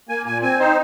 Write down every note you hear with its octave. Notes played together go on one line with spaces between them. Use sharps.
A#3 G#5
A#2 G#5
C4 G#5
D#4 C5